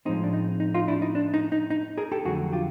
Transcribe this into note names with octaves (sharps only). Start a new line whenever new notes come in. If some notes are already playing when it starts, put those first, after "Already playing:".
A2 F3 G#3 C4 D#4
D4
D#4
D#4
D#4 F4
D4 E4
D#4
D4
D#4
D#4
D#4
G#4 A#4
G4 A4
F2 D3 F#3 A3 F#4 G#4
F4 G4